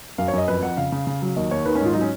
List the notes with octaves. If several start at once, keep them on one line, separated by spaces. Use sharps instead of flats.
F#2 F5
C#5
F#2 D#5
F2 B4
F2 F#5
C#3 F5
C#3
C#3
F#3
D#2 D#5
D#2 C#5
D#3 B4
C#4
G#2 F4
F#3 D#4
C#4